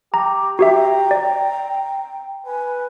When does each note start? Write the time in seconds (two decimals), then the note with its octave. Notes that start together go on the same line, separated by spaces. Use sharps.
0.14 G4 A#5
0.59 F#4 G4 E5 G5 A#5
1.11 D5
2.46 B4 G#5